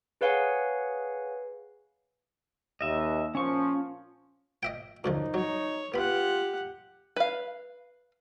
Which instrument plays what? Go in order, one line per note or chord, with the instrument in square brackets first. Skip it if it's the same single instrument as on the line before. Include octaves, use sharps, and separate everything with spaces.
[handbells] G#4 B4 C#5 F5 F#5 G#5
[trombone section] D#2 [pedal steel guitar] D#5 E5
[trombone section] A#2 F3 [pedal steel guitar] C#4 C#6
[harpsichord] D#5 E5 G5
[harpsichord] F#2 D3 F3 [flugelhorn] D#4
[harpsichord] F#3 [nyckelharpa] C#5
[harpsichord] B3 B5 [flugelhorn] F4 [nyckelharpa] G4 F#5
[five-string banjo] B4 F5